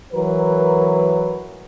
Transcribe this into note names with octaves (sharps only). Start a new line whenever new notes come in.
E3 F#3 A#4 B4